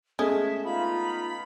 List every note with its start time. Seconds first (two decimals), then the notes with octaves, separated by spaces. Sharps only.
0.19 G#3 A3 C#4 E5
0.65 B3 D#4 F4 B5